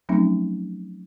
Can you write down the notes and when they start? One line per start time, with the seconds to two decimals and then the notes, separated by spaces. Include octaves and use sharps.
0.09 F3 F#3 A3 C4 C#4 D#4